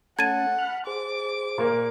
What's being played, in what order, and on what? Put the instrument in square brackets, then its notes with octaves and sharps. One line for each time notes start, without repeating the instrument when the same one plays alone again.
[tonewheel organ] A3 C#4 [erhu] F#5 [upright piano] A5 [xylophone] G#6 A6 D#7
[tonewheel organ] B5 F6 F#6
[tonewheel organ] G#4 C5 [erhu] D6
[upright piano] A#2 A#3 A#4